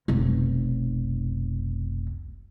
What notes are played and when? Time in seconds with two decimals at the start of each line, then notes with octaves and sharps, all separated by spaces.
0.08 F1 B1